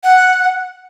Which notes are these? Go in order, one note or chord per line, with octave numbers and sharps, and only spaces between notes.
F#5